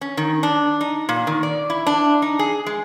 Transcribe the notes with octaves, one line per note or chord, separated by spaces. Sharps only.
C#4
D#3
D4
D#4
A#2
D#3
D5
E4
D4
D#4
G#4
G#3